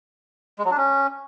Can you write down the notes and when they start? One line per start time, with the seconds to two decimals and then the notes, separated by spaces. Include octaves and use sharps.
0.59 G#3
0.65 F#3
0.71 D4
0.77 C#4